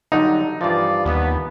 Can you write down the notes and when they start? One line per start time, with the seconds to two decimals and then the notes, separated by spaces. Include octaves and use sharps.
0.12 D3 F#3 G3 D#4
0.61 G2 E3 F3 F4 D5
1.06 D#2 B3